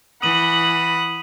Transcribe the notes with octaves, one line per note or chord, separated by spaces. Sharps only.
E3 F#5 B5 D#6 D#7 F#7